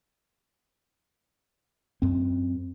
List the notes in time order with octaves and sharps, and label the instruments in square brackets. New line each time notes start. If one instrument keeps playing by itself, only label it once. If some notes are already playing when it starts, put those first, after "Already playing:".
[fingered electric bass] F#2 C4